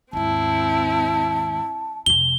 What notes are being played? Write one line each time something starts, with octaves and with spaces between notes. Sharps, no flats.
D#2 G#2 C4 E4 A5
F2 C3 G7